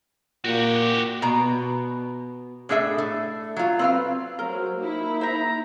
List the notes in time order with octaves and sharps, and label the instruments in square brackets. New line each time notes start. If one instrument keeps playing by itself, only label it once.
[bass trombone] A#2 [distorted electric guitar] F#4 G4
[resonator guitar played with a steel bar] B2 A#5
A2 D4 G#4 A4 E5
A3
F#3 F4
C4 B4 F5
[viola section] F#3 [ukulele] A#4 [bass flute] C5
[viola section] A#3 E4 [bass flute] D#4
[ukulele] C5 E5 [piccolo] A#5